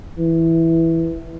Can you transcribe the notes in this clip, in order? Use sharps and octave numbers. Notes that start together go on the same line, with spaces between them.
E3